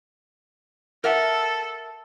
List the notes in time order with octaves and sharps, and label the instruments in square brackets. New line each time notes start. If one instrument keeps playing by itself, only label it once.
[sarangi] A4 [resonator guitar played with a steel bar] A#4 E5 F#5